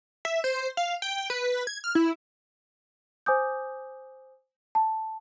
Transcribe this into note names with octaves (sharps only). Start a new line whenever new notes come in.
E5
C5
F5
G5
B4
G#6
F6
E4
C5 G#5 D6 D#6 G6
A5